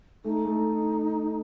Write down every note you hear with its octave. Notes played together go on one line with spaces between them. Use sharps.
A3 D#4
A3